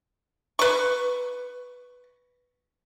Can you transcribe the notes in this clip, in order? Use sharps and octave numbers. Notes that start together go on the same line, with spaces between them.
B4 C#6